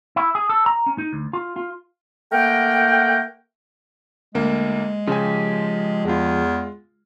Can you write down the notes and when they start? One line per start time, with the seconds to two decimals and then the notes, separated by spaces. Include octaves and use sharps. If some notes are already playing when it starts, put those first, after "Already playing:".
0.16 E4
0.35 G#4
0.49 A4
0.66 A#5
0.86 C#4
0.98 D#4
1.13 D2
1.33 F4
1.56 F4
2.33 A3 A#3 A#4 F#5 G5
4.35 D2 G#3 A#3
5.07 C#3 F3 G4 G#5
6.05 E2 G#3 F4